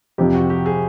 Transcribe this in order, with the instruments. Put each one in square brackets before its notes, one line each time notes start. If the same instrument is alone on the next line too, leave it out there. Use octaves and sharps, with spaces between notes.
[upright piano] F2 C3 F3 [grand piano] G4
[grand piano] F#4
G4
G#4